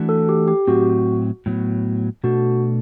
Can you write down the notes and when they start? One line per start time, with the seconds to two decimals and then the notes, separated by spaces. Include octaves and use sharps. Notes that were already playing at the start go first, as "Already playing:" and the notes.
Already playing: E3 A3 D4 F#4
0.09 A4
0.29 G4
0.48 G4
0.67 A2 F#3 C4 F#4
1.46 A2 F#3 B3
2.24 B2 A3 D4 F#4 A4